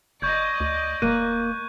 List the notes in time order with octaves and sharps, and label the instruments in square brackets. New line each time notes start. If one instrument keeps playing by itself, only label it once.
[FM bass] F#1 [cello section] D5 D#5 [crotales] C#6 G6 G#6
[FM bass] D2
[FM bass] D#1 [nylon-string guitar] A#3 [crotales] F#6 D#7